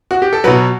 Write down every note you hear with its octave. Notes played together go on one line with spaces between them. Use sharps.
F#4
G4
A4
B2 F#3 B4